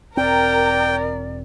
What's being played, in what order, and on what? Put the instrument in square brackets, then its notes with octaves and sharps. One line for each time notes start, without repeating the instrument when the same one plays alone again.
[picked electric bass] E1 C4 [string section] A#4 [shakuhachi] D5 [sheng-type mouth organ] G5